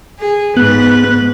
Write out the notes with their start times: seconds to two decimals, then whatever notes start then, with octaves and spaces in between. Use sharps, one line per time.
0.19 G#4
0.57 G#2 B3 B4 F#6